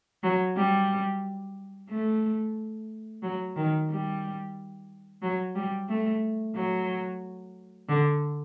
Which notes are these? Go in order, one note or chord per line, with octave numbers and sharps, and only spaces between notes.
F#3
G3
A3
F#3
D#3
G3
F#3
G3
A3
F#3
D3